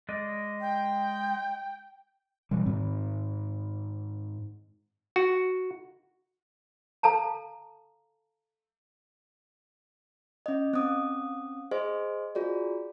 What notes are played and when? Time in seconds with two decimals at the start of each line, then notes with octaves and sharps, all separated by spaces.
0.09 G#3 D5 D#5
0.61 G5
2.51 B2 E3 G3
2.66 G#2 D#3 C4
5.16 F#4
7.03 A4 F5 A5 A#5
10.46 C#4 D#5
10.73 C4 C#4 D#6
11.71 G#4 C5 D#5
12.35 F4 F#4 G#4 D5